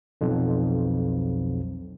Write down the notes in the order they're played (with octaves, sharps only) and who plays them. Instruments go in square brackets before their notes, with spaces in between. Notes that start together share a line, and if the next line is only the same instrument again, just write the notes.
[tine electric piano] B1 F2